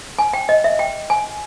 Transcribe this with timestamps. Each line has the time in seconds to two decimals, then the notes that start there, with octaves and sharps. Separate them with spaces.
0.19 G#5
0.33 G5
0.49 D#5
0.64 E5
0.79 G5
1.10 G#5